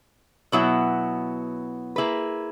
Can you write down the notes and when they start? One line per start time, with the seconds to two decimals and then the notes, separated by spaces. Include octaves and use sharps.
0.52 B2 F#3 B3 E4
1.96 A#3 E4 G#4 B4